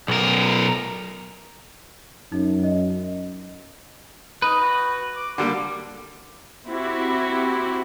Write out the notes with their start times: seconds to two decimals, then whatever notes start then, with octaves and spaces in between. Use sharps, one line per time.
0.08 B1 A#4
2.32 F#2 D#4
2.64 D#5
4.42 D#4 B4
4.62 F#4
5.16 D6
5.38 D3 G3 A#3 D6
6.68 C4 E4 F#4 G4